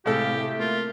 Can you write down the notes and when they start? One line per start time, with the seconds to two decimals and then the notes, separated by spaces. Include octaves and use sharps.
0.06 A2 C3 G#3 G4 A4 F5
0.37 A3
0.59 A#3 F4